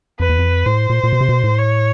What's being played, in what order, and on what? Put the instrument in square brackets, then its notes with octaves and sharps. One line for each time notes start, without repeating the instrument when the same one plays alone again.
[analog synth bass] F2 [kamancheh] B4
[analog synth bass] E2
F2
[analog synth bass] A2 [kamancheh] C5
[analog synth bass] A#2
A#2
B2
C3
B2
A2
[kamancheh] C#5